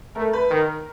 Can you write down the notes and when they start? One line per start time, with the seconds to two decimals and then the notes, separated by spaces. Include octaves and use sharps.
0.15 A3 A#4
0.33 B4
0.50 D#3 A#4